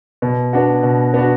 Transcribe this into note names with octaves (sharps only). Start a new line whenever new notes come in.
B2
B3 D4 F#4
B2
B3 D4 F#4